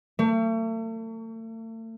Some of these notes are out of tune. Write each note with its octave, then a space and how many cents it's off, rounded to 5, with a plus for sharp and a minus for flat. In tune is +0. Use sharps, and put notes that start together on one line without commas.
A3 +40